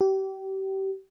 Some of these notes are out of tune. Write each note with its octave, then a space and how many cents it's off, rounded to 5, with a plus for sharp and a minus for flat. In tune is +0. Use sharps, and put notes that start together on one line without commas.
G4 -30